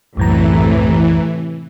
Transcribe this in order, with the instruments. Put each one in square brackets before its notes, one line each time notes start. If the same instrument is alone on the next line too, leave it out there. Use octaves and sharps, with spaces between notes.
[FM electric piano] C2 F#2 A#5 [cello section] A2 C3 A3 [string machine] E3